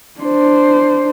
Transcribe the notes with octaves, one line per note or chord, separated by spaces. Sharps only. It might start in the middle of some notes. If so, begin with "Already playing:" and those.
D4 C5